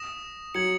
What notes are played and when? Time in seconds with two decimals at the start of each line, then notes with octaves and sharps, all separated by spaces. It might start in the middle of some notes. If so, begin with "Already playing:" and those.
Already playing: D#6 A#6 E7
0.54 F#3 G#6 C#7 F#7